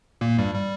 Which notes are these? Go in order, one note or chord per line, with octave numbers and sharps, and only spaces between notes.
A#2 A#3
G2 G3
G3